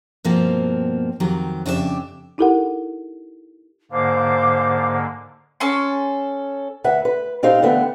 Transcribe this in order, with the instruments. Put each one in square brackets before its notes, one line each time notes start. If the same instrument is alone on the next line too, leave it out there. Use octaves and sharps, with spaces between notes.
[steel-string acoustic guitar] G2 B2 F3 A#3 C4
F2 D#3 F#3 G4
F2 C#3 D4 G4 G#4 E5
[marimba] D#4 E4 G4 A4 A#4 F#5
[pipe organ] G#2 D3 A#3 [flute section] C5 F5 D6
[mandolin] C#4 A4 C6
[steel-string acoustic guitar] D2 B4 E5 F#5
B4
A#2 C4 D#4 G4 F5
D3 E3 A3 B3 C4